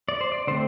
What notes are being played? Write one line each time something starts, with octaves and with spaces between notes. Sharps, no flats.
D5
C5
D5
D3 A3 C4 C5